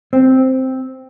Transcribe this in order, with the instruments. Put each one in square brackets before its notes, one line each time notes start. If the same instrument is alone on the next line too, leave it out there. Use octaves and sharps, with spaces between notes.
[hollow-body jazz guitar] C4